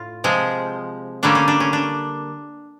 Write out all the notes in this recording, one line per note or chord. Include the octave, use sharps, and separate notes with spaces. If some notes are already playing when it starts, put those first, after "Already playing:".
Already playing: A2 F4
C3 F3 G#3
D3 G3 A#3 C#4 D4
C#4
D4
C#4
D4